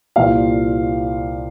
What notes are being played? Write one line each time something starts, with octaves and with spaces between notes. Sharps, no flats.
C2 A#2 F3 F5